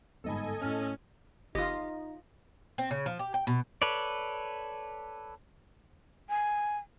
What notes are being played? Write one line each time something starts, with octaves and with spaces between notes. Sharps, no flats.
G1 G#2 A4 D#5 G#5 B5
A2 C#4 F6
G1 D#4 F4 G4 D#5 A#6
C4
C#3
F3
G4
G5
B2
A4 B4 C#5 D5
G#5